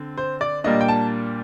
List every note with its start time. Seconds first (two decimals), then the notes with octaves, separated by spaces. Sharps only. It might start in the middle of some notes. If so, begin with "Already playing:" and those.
Already playing: D3 C4
0.17 C5
0.41 D5
0.64 A#2 G3 A#3 D4 D#5
0.81 G5
0.88 A5